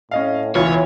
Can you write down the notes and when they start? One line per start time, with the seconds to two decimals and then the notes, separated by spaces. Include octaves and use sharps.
0.11 A2 C#4 D#5 F5
0.55 E1 C#2 E3 F4 C#5